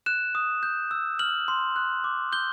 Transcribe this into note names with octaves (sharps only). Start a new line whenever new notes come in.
F#6 E7
D#6
G6
E6
F6 F#7
C6
F#6
D6
G6 G7